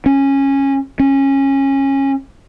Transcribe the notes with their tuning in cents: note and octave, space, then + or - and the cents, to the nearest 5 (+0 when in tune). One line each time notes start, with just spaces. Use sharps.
C#4 -15
C#4 -20